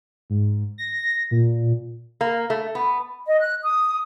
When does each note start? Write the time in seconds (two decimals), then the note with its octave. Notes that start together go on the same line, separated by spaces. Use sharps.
0.30 G#2
0.78 A#6
1.31 A#2
2.21 A#3
2.50 A3
2.75 B3
3.26 D#5
3.40 F#6
3.63 D#6